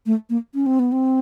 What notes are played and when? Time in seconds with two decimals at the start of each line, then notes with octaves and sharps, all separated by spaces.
0.06 A3
0.30 A#3
0.54 C#4
0.66 C4
0.79 B3
0.92 C4